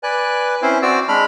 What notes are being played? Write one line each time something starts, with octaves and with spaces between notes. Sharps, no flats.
B4 D5 G#5 F#6
C4 C#4 E4 C5
C4 F#4 D5 E6
G#3 D4 B5 F6